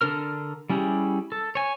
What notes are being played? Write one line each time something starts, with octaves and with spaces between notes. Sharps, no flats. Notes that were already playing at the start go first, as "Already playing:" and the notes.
D3 D4 A4 A#4 F6
G3 C#4 E4 G4 G#4
A4
C#5 G#5